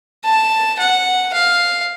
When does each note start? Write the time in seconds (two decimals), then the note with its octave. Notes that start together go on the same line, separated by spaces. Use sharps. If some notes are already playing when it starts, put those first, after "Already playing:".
0.25 A5
0.79 F#5
1.33 F5